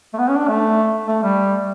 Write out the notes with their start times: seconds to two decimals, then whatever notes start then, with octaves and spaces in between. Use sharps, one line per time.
0.13 A3
0.18 B3
0.28 C#4
0.38 D4
0.48 A3
1.07 A3
1.23 G3